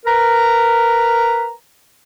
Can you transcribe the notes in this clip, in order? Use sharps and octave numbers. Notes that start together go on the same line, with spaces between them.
A#4 B4 A#5